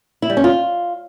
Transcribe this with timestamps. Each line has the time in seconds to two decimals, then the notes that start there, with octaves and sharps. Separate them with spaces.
0.22 E4
0.30 G3
0.37 C#4
0.44 F4